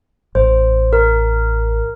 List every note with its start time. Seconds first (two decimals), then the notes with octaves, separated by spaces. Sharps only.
0.35 A1 C5
0.93 A#4